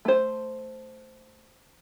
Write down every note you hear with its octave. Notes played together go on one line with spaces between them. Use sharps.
A3 C5